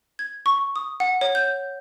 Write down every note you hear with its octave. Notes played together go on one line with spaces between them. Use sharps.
G#6
C#6
D#6
F#5
C#5
G6